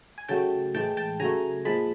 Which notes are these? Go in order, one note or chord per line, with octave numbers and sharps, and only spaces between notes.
G#5
C#3 F#3 A3 G5 A5
A2 E3 G#3 G5 A5
G5 A5
C#3 F#3 A3 G#5 A#5
A#2 F3 G#3 A5 B5